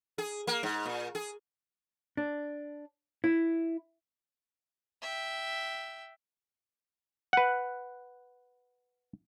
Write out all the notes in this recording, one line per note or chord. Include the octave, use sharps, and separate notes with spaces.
G#4
A#3
G#2
A#2
G#4
D4
E4
E5 G5
B4 F#5